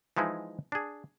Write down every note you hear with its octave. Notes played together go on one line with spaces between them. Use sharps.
E3 F3 G#3 D#4 E4
D4 G#4